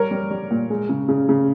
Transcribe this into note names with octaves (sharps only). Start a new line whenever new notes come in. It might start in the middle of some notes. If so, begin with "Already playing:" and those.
Already playing: G3 A#4 C#5
G3
G3
A#2
G#3
C#3
C#3
C#3